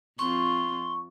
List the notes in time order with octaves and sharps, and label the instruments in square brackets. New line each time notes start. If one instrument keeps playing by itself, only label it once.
[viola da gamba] F2 C4 F4 [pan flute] C6 [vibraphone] C#6